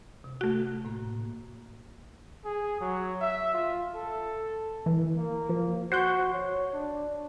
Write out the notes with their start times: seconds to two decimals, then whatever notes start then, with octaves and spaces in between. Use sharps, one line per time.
0.24 C3
0.41 A3 F#4
0.85 A2 A#3
2.45 G#4
2.81 F#3
3.21 E5
3.54 F4
3.95 A4
4.86 E3
5.16 A#3
5.49 F3
5.92 F#4 C5 F#5 G6
6.33 C#5
6.73 D4